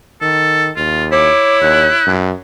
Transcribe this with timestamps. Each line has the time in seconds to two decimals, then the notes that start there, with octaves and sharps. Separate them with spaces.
0.22 D#3 A4
0.76 D#2 F4
1.12 E4 C#5 D6
1.61 D#2 F#6
2.07 F#2